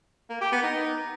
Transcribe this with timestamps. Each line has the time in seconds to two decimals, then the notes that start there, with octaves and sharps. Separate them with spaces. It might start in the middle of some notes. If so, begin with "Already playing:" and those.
0.30 A#3
0.41 G4
0.52 B3
0.63 D#4